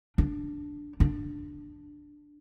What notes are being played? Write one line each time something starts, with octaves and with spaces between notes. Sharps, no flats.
D4
D4